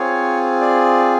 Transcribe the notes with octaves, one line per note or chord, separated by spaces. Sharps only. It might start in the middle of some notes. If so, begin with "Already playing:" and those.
Already playing: C4 F4 G#4 C#5
D5